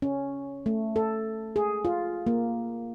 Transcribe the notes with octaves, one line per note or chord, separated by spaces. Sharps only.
C#4
A3
A4
G#4
F4
A#3